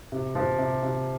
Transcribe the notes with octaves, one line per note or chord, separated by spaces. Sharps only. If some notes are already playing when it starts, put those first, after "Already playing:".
C3
F3
C3
C3